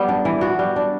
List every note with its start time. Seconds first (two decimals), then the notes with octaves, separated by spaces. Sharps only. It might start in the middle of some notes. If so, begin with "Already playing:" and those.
Already playing: G3 B3
0.09 D4
0.25 E3
0.41 B3 F#4
0.59 G3
0.76 D4